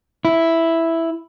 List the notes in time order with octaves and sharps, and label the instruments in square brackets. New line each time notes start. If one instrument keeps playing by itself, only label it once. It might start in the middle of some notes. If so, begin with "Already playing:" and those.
[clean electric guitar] E4